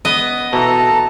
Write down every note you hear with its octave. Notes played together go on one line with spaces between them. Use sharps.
B3 D#5
B2 E3 A4 A5 A#5